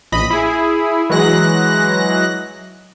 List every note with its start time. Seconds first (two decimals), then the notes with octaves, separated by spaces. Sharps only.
0.12 A#1 D#5 B5
0.30 E4 G#4
1.10 E3 F#3 G#3 F#6 A#6